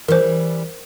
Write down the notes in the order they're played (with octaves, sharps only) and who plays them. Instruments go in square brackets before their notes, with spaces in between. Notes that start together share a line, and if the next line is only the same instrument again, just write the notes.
[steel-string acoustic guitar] E3 G3 [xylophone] A#4 C5